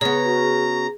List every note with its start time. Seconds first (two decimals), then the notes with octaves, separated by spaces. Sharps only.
0.01 C#3 B3 G#4 A#5
0.24 F#4